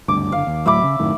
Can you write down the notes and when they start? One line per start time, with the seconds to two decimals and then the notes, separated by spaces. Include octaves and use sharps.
0.08 F#1 D2 G2 D6
0.32 F#1 D3 F5
0.47 D#2
0.66 D1 A2 F#3 E5 B5 D6
0.83 C#3
0.99 F#2 A2 D#3